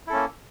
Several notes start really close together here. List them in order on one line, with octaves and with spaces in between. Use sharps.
E4 A4 C#4 A#3